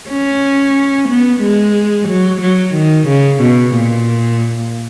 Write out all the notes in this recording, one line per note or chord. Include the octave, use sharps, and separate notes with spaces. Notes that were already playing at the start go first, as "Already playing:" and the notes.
C#4
B3
G#3
F#3
F#3
D#3
C#3
B2
A#2